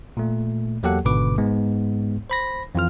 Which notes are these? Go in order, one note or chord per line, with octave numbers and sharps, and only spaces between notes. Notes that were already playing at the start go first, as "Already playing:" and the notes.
A#2 A3
E2 F#3 A#3 G4 A4 F#5
G#1 G#2 B2 D3 B4 D6
G#2 G#3 B3
C5 B5 A#6
F2 E3 F4 F6